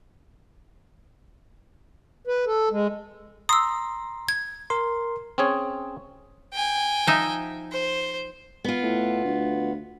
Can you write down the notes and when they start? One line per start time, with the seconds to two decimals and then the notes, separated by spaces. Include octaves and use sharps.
2.27 B4
2.47 A4
2.71 G#3
3.49 A#5 C6 D#6 E6
4.29 G#6
4.70 A#4 C6
5.38 C4 C#4 G#4 C#5
6.53 G5 G#5
7.07 F3 D#4 E5
7.72 C5
8.64 B3 F4
8.83 A2
9.24 D2